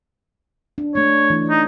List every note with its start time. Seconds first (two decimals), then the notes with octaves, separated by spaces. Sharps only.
0.78 D4
0.95 A3 D4 C#5
1.30 E3 D4
1.50 D#4